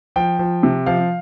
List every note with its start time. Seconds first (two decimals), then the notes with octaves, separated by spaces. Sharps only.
0.16 F3 G5
0.39 F3
0.63 C3
0.86 F3 F5